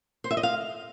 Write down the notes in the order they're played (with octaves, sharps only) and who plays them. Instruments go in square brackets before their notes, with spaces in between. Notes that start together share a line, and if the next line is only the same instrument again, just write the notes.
[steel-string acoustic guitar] C5
E5
D#5
F5